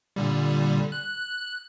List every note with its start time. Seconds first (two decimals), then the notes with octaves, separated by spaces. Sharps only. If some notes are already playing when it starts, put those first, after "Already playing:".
0.16 A#2 D3 G3
0.92 F#6